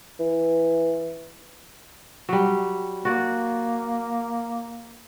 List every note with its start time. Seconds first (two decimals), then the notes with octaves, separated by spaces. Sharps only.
0.19 E3
2.29 F#3 G3
3.05 A#3 F#4 D5